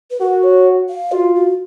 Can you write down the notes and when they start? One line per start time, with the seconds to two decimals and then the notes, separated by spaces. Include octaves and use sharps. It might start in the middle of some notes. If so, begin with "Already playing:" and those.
0.11 B4
0.20 F#4 A#4
0.43 C#5
0.89 F5
1.12 F4 F#4
1.35 F#4